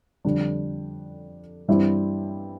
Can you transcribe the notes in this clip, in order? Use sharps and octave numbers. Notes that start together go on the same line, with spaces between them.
F2 D3 G3 D4
G2 E3 G3 C4 E4